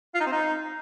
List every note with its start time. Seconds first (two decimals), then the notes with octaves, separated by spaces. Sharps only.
0.15 F4
0.20 D#4
0.26 C4
0.32 D#4